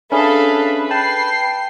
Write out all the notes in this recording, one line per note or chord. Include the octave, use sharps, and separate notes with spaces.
C#4 D4 G#4 A4 B4 E5 F5
G5 A5 C7